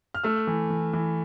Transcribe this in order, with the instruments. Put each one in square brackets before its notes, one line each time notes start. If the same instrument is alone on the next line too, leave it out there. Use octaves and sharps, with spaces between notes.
[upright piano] F6
A3 E6
E3
E3
E3